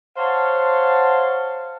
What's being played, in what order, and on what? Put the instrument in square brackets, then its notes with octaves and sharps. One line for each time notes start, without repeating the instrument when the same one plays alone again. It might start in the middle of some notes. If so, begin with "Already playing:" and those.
[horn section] C5 C#5 F5 F#5 A5